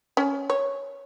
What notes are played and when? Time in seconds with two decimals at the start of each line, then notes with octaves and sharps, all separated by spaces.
0.17 C#4
0.50 C#5